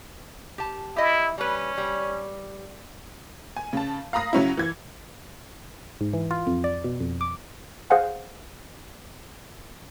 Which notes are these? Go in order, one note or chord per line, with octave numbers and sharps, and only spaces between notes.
G4 A5
E4 G4 D#5
G3 C#4 B4
G3
G#5
C#3 A5
F5 A#5 B5 D#6 A#6
C#3 F#3 C#4 E4
E3 G#6
G#2
E3
F4
F2
D5
B2
F2
D6
G#4 C5 F5 F#5 G#5